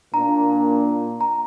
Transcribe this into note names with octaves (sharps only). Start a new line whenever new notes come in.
A#2 A#3 D4 A#5
A#5